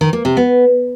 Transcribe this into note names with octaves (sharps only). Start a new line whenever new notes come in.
D#3
A#3
C3
B3